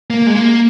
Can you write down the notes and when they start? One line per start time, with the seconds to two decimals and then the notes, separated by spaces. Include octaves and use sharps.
0.10 A#3
0.27 G#3
0.35 A#3